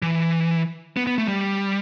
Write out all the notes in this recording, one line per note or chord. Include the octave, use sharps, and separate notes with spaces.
E3
B3
B3
A3
G3